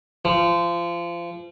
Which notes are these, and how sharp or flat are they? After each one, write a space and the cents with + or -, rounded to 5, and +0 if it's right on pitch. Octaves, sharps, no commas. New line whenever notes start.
F3 -25